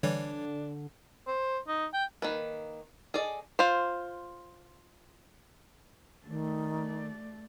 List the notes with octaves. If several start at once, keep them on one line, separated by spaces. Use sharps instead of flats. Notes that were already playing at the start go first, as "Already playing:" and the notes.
D3 E3 G3 D4 C#5
C5
D#4
G5
D#3 A#3 B4
G#4 A4 D5 D#5
F4 C5
D#3 A3 D5